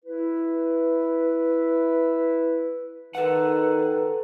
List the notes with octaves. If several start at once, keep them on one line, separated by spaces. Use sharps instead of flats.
E4 B4
D#3 A4 B4 F#5